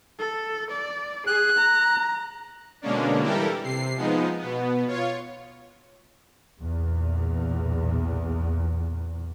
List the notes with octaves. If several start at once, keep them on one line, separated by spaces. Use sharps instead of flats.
A4
D5
G#4 F#6
A#5
B2 D3 G#3 A#3 C#4 D4
E3 G3 E4 G4 A4 A#4
C3 C7
F3 G#3 B3 D#4
B2 B3
F4 C#5
B1 E2 A#2